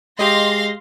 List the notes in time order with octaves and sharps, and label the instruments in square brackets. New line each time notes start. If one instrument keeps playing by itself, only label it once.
[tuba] G#3 [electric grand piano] G4 D#5 [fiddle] F5 [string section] C6 A#6